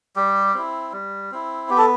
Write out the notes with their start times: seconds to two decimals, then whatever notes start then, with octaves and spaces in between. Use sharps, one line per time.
0.16 G3 G4
0.54 C4 E4
0.92 G3
1.32 C4 E4
1.70 B3 G4
1.78 A4